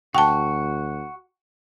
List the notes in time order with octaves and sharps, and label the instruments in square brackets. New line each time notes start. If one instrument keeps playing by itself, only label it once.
[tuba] D2 [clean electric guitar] F#4 [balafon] G5 A5